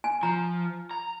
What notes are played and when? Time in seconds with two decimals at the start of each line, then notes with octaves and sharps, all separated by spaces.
0.04 G#5
0.23 F3 A#5
0.91 A#5